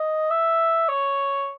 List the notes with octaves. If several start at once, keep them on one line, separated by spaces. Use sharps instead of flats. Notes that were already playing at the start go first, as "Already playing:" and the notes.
Already playing: D#5
E5
C#5